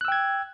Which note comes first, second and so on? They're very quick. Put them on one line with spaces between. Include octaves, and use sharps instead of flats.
F#6 E6 G5 G#6